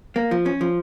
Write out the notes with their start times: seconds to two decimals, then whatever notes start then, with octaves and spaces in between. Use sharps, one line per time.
0.16 A#3
0.31 F3
0.46 C#4
0.61 F3